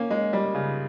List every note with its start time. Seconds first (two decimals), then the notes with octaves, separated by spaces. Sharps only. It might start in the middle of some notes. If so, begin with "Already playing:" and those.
Already playing: A#3 C#4
0.11 G#3
0.33 G3
0.55 C#3